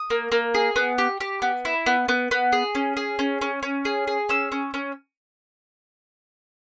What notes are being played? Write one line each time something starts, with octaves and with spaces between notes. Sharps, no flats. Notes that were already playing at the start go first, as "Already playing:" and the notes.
Already playing: D#6
A#3
A#3
G#4
B3
G4
G4
B3
E4
B3
B3
B3
G#4
C#4
G#4
C#4
C#4
C#4
G#4
G#4
C#4 E6
C#4
C#4